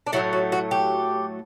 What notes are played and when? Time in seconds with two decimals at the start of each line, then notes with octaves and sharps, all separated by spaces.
0.07 D4
0.12 A2 F#3 A3 E4
0.33 F#4
0.52 F#4
0.71 G4